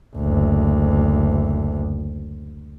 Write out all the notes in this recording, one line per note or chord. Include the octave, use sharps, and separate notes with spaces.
F#1 D2